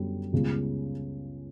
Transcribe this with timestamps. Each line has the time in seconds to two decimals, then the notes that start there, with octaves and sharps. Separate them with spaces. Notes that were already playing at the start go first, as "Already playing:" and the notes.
Already playing: F#2 D3 G3 B3
0.32 C#2 C#3 G3 B3